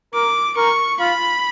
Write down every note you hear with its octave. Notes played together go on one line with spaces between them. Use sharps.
A#4 D6
A#4 C#6
F4 B5